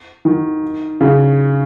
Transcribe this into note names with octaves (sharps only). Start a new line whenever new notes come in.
D#3
C#3